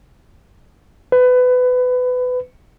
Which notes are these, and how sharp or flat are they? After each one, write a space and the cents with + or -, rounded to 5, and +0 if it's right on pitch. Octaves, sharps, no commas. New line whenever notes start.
B4 +25